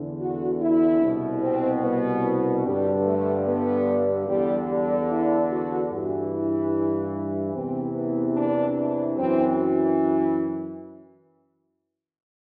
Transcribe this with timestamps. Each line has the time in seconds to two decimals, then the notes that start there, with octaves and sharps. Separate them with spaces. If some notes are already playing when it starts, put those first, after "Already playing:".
Already playing: E2 D3
0.20 F#4
0.60 E4
1.01 C2 B2
1.42 C4
1.82 B3
2.64 G2 D3 G3
3.05 A3
3.46 B3
4.27 E2 D3 G3
4.68 G3
5.09 E4
5.50 F#4
5.90 G2 E3 F#4
6.31 E4
7.53 E2 C3 E3 C4
7.94 B3
8.35 D4
8.76 D4
9.17 F#2 E3 C4